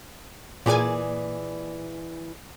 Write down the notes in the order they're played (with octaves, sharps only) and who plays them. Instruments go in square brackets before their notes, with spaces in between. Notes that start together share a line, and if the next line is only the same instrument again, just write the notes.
[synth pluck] A#2 G#5 [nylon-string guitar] E3 G#4 D5